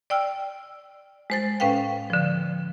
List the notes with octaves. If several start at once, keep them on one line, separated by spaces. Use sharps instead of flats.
D5 G5 E6 F6
G#3 C5 A6
A2 C#4 B4 F5 G5
D3 F3